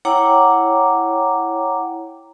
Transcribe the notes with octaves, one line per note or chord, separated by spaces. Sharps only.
E4 C#5 F#5 G5 A#5 D6